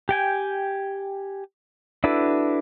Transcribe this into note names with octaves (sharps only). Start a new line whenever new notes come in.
G4 G5 G#5
D4 E4 F#4 A4 B4